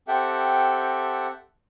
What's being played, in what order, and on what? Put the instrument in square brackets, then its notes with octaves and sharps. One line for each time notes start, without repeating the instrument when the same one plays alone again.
[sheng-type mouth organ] C4 G4 A4 E5 F#5 G5